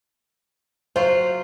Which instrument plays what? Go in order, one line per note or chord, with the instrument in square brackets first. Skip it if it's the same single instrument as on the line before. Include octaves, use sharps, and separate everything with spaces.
[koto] F#3 F4 [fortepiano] C5